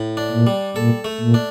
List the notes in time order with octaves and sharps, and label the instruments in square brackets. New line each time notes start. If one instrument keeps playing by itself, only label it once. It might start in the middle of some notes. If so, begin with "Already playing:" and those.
Already playing: [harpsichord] A2
D4
[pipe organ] A#2
[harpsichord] G3
[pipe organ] A#2 [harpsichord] A4
[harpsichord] A3
[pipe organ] A#2
[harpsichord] D4